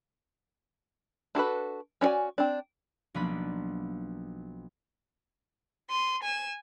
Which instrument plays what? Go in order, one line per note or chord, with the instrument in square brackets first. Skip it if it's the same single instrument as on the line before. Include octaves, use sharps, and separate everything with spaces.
[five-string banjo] D4 F#4 A4 B4
C#4 D4 F#4 D5 G#5
C4 D4
[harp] B1 F3 A#3 B3 D4 B5
[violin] C6 D#7
G#5 E7